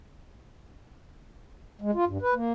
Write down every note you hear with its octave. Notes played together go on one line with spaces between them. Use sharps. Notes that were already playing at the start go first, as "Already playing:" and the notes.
G#3
F4
G2
B4
A#3